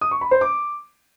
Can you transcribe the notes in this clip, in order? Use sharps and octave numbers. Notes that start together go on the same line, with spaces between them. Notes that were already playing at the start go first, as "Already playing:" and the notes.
D#6
C#6
B5
C5
D6